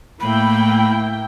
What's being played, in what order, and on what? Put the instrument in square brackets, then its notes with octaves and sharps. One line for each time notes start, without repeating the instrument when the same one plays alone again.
[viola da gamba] A2 [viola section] A#3 E4 G5 [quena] B5